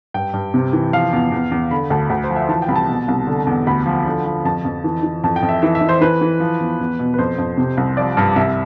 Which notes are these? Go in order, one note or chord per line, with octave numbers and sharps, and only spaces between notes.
G2 G5
G2
C3
E3
F3 F5
E2
E2
E2
D3 B5
D2 A5
D2
C5
F3
E5
E3 A5
G5
C2 B5
A5
B2
C2
D3
E2
D2 B5
F3
D3
F3
F2 A5
F2
E3
E3
F2 A5
G5
F2
E5
E3 E5
E5
E3
C5
E3 B4
E3
F3
E2
E2
B2
B4
F2 C5
F2
C3
C2
F3 D5
G2
C2 E5